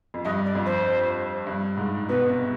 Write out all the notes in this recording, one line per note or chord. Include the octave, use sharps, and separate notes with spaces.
F2
G2 D#5
D5
F2
C5
G2
G#2
B2 B4
C3